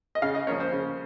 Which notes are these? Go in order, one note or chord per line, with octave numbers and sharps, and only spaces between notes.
D#5
C#3 F5
D#5
F3 A#3 C#4 C#5
C5
C#3